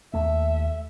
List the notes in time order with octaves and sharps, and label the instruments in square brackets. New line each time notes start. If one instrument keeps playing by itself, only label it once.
[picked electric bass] D#2 A3 [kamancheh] E5